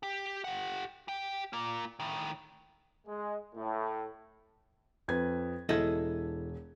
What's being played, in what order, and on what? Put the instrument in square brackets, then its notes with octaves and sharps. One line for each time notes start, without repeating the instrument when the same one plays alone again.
[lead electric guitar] G4
G4 F#5
G4 G5
A#3 F4
A2 D#3
[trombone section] G#3
A2
[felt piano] F2 B4 G#6
[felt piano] E1 G#6 [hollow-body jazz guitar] E4 A4 D#5